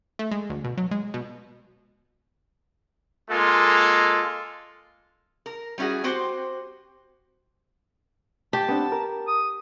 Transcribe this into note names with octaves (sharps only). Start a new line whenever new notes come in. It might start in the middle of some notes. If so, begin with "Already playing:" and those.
A3
G#3
D2
B2
F#3
G#3
B2
G#3 A#3 F4 A4
A#4
G3 C#4 E4 F#4 G#4
C4 F#4 G4 C5
G4 A5
B3 C4 D4
A#4
D#6